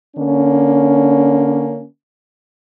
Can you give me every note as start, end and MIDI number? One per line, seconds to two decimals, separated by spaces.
0.17 1.85 50
0.17 1.85 58
0.17 1.85 61